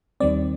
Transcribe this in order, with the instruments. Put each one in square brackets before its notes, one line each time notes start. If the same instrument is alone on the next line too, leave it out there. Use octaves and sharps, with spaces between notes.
[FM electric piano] D#2 D#3 G3 C4 D5